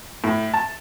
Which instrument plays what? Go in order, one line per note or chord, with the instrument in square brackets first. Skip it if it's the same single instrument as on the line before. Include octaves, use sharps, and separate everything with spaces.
[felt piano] A2
A5